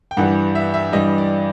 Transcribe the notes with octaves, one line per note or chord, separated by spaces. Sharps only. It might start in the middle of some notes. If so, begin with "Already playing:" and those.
G5
G2 E3 G3 F#5
E5
E5
G2 E3 G3 D#5
D5